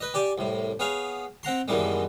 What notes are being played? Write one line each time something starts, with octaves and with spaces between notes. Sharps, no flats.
B4 D#5
G4 D5 G#5
C2 A2
B3 G#4 C#5 F5
C4 F#5 A#5 C6
F#2 B2 D#3 E3 G3 G#3